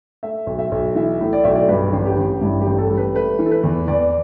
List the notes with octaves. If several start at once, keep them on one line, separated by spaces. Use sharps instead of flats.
A3 E5
B1
E5
B1
E3 E5
A2
D5
B1 E5
D5
G2 B4
A1
G4
A1
G2 E4
G4
A1
A4
G3
B4
A3 B4
E3
A4
B4
E2
E2 D5